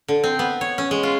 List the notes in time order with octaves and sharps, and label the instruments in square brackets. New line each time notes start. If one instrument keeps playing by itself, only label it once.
[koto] D3
C4
B3
C#5
C#4
G#3
F4